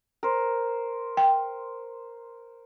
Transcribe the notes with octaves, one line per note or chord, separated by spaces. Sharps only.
A#4 C5
G5